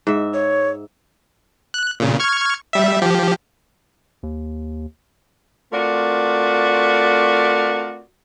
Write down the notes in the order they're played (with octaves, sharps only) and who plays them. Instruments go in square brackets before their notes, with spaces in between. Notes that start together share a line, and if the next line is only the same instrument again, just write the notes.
[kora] G#2 E5
[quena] C#5
[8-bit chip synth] F#6
A#2 C#3
C#6 F6 G#6
G3 E5
F3 G4
[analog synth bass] D#2
[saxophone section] A3 C4 F4 F#4 A#4 D5